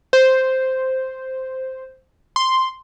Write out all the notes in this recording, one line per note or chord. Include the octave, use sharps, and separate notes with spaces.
C5
C6